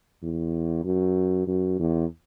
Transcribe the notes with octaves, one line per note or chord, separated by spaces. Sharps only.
E2
F#2
F#2
E2